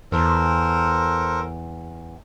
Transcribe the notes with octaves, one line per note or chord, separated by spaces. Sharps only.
E2 A4 A#4 C5